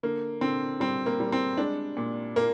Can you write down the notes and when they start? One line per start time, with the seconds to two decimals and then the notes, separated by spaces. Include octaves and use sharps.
0.03 D3 A#3
0.41 D3 C4
0.80 G3 C4
1.06 A#3
1.20 G3
1.32 C4
1.58 G#3 D4
1.97 A#2
2.36 A#2 A#3